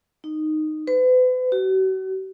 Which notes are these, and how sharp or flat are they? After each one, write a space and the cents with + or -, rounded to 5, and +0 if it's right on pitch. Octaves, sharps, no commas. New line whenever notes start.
D#4 -10
B4 +40
F#4 +40